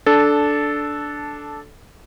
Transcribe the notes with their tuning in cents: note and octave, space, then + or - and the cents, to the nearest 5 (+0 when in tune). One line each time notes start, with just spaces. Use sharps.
D4 -5 A4 -10